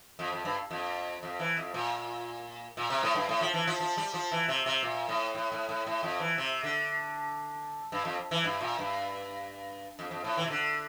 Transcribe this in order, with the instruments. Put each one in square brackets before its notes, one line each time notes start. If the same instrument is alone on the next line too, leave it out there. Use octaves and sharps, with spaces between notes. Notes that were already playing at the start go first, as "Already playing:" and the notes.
[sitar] F2
F2
G2
F2
F2
E3
F2
A#2
A#2
C3
A2
G2
A2
F3
E3
F3
F3
G3
F3
E3
C3
C3
A#2
A2
A2
A2
A2
A2
F2
E3
C3
D3
G2
F2
E3
G2
A#2
G2
F2
F2
A2
E3
C3
D3